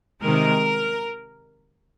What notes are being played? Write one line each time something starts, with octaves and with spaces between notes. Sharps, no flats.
C3 D#3 G#3 A#4